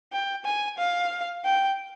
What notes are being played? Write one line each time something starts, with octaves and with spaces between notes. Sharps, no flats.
G5
G#5
F5
G5